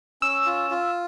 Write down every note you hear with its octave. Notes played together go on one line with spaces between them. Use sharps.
C#4 E6
F4
F4